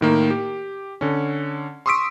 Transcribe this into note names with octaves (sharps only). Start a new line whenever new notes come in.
A2 D#3 A#3
G4
D3 C#4
C6 C#6 D#6 E6 B6 D7